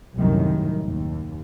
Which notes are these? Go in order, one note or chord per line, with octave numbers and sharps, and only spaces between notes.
C2 F#2 A2 D#3
D#2